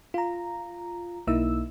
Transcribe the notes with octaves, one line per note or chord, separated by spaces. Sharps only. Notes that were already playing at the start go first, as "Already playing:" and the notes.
F4 A#5
B1 A#3 D#4 E4 E6